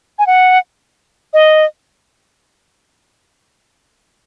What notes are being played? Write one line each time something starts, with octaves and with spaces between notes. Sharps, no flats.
G#5
F#5
D#5